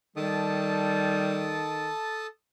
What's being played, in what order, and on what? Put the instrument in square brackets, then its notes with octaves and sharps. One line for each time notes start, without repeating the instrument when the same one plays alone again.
[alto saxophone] D#3 [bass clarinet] G3 [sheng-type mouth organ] A4 A5 D#6